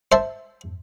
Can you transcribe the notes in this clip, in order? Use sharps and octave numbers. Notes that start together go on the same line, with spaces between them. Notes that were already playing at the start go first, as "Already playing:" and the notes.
C5 E5 A5